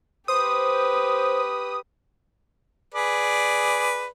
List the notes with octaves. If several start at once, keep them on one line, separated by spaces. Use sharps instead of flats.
G4 B4 C5 D#6
G#4 B4 D5